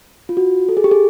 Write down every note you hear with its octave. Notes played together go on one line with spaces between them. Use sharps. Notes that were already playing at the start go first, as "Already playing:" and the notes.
F4
F#4
A4
G#4
G4
G#4